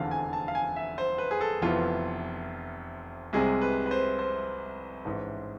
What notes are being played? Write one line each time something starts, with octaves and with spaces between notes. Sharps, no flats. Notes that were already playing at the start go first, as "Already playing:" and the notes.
Already playing: F1 E2 D3 F3 F5
G#5
A5
F5
G#5
E5
C5
B4
G#4
A4
F1 F2 E3 B3 F4
C2 C3 G#3 C4 G#4
B4
B4
C5
C5
A1 G#2 E3